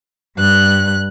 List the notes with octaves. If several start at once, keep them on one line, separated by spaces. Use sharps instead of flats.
G2 F#6